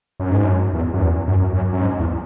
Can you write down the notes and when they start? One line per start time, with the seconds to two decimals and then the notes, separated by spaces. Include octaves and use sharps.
0.20 F#2
0.31 G#2
0.44 F#2
0.73 E2
0.94 F#2
1.00 E2
1.27 F#2
1.54 F#2
1.73 F#2
1.81 G#2
1.99 E2